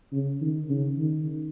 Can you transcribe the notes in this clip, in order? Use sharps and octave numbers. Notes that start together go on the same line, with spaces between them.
C#3
D#3
C#3
D#3